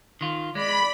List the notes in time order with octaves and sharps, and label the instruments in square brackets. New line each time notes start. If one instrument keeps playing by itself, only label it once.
[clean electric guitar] D#3 F4
[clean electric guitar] G#3 [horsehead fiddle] D5 [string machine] B5